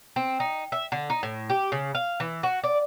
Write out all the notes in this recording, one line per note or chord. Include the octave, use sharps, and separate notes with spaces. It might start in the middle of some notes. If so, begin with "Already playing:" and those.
C4
D#4
E5
D3
D#4
A2
G4
C#3
F5
E3
F#4
D5